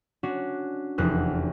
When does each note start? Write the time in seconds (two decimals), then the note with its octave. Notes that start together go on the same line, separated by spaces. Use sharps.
0.23 C#4 D4 F#4
0.98 F1 E2 F#6